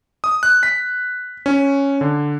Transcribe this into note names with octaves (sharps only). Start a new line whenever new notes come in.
D#6
F#6
B6
C#4
D3